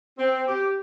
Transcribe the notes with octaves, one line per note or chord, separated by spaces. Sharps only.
C4
G4